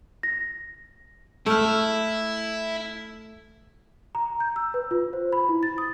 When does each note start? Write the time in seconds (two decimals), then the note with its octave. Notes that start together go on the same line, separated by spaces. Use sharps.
0.23 A#6
1.46 A3 E4 E6 F6
4.15 A#5
4.40 G6
4.56 E6
4.74 B4
4.91 F4
5.13 C5
5.33 B5
5.49 E4
5.63 A6
5.78 D#6